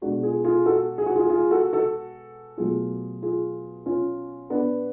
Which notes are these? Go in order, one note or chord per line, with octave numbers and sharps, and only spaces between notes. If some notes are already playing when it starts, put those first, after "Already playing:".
B2 G#3 D4 F#4
F4 G#4
F4 G#4
F#4 A4
G#4
F#4
F4 G#4
F4 G#4
F#4 A4
F#4 A4
B2 F#3 A3 F4 G#4
F4 G#4
C#4 F4
B3 D4